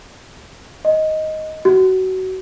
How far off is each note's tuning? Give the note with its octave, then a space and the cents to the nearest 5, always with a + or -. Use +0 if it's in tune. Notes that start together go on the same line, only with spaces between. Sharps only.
D#5 +5
F#4 +20